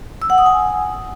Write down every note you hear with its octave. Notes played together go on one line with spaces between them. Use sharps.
E6
F#5
D#6
G#5